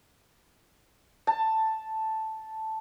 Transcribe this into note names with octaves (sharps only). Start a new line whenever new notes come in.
A5